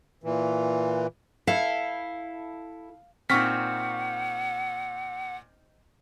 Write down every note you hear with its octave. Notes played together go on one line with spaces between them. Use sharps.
A#2 E3
E4 A4 F5
A#2 C4 D#4 F#5 C#6 F6 B6